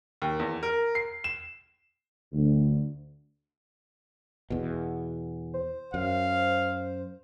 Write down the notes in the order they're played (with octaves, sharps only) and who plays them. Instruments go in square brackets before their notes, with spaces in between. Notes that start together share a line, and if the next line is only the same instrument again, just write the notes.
[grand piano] D#2
E2
A#4
C7
E7
[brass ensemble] D2
[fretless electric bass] E2 B2
[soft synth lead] C5
[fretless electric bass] F#2 [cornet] F5